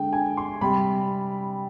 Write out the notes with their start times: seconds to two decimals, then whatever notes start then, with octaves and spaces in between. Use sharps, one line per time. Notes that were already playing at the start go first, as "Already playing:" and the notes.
Already playing: D3 G#3 G5
0.13 G#5
0.37 C6
0.61 C3 G3 B5